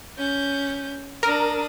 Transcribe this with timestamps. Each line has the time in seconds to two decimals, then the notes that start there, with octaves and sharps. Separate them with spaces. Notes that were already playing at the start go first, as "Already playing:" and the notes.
0.17 C#4 G6
1.23 D4 A#4 D#6